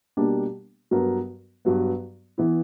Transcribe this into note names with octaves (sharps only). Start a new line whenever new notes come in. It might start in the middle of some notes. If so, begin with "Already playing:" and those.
B2 G3 A#3 D4 G4
G2 F#3 B3 D4 A#4
G2 F#3 B3
E3 B3 E4